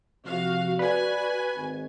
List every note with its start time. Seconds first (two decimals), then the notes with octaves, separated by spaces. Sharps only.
0.24 C3 F3 F#4 F5
0.79 F#4 B4 D5 G#5
1.56 G#1